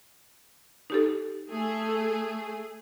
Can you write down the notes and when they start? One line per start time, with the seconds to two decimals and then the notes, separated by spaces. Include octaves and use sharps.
0.90 D#4 G4 A4
1.50 A3 G#4